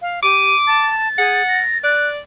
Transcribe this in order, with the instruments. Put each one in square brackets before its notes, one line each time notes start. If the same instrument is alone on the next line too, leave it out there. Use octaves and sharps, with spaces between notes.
[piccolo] F5
[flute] G4 [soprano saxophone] D6 [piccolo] D#7
[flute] A5 [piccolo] A6
[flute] G#4 [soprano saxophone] F#5
[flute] A#6
[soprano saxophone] D5 [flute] F#6